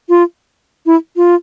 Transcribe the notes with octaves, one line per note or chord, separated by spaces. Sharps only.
F4
E4
F4